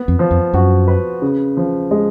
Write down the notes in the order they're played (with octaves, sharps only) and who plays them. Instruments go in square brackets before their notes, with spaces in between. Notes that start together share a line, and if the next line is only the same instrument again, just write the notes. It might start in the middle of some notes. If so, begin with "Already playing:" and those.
Already playing: [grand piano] B3
[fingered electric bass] F2
[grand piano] F3
[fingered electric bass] F2
[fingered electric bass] F#2 [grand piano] F#4
[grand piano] B4
C#3
F3
G#3